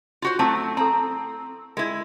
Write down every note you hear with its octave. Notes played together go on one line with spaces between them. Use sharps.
F4 F#4 C5
F#3 A3 C4 E4 A5 D6
C4 A4 A#5
G#3 E4 A#4